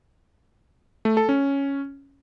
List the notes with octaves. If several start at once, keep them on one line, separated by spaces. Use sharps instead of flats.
A3
A4
C#4